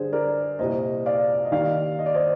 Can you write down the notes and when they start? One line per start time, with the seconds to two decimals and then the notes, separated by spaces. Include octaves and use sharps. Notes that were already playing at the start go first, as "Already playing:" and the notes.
Already playing: G2 D3 G#4 C5
0.13 A#4 D5
0.59 C2 A#2 C5 D#5
1.06 D5 F5
1.45 D#5
1.52 D#2 D#3 D5 F5
1.99 D#5
2.06 D5
2.15 C5 D#5